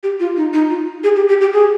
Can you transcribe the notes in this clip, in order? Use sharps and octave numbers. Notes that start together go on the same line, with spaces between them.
G4
F4
D#4
D#4
F4
G#4
G4
G4
G4
G#4